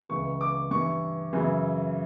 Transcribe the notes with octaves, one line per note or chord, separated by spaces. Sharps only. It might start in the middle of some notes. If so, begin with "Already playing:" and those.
C#2 C#3 E3 C#6
D6
G2 E3 C#6
F#2 C#3 E3